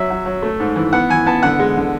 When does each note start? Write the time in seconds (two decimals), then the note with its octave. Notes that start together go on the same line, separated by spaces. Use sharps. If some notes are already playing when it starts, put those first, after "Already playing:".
Already playing: F#3 E5
0.10 F#3
0.26 F#3
0.42 A3
0.60 G#2
0.76 E3
0.92 B3 F#5
1.10 E3 G#5
1.26 B3 A5
1.43 D3 F#5
1.59 G#3
1.77 D3